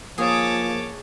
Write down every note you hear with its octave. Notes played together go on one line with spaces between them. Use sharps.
F3 A#3 G#4 C#5 A5 D6